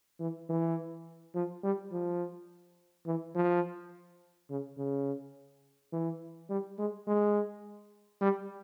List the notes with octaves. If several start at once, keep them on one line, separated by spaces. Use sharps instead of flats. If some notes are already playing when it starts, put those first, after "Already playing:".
E3
E3
F3
G3
F3
E3
F3
C#3
C#3
E3
G3
G#3
G#3
G3